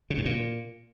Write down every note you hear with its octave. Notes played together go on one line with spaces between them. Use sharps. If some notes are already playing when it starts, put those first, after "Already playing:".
C#3
G2
A#2